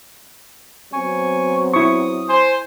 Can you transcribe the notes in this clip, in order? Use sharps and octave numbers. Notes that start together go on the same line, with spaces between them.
F#3 B3 C4 G#5 C#6
E4 C#6 D#6
C5 G#5 C6